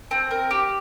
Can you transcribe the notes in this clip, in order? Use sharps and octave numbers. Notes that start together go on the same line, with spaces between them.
C4
A#4
G4